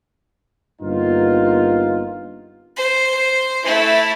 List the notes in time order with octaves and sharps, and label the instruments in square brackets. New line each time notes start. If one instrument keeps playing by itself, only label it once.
[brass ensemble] G1 G2 A#3 B3 D#4 F4
[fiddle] C5
A3 E4